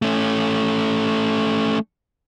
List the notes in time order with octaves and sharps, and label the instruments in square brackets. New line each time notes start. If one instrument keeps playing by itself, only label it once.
[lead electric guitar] A3 C#4